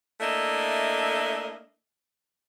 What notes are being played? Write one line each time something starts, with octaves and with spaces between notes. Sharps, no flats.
A3 A#3 D4 E4 D#5 E5